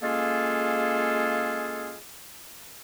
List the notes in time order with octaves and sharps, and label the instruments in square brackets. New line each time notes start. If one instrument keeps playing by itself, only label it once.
[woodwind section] G#3 A#3 C#4 F4 G#4 A4